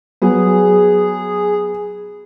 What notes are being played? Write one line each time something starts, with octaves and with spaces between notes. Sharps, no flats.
F#3 B3 G#4